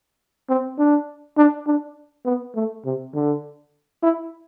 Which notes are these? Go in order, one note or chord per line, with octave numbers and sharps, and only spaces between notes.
C4
D4
D4
D4
B3
A3
C3
D3
E4